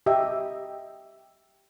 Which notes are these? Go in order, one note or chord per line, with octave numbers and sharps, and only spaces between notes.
G4 D#5 E5 G5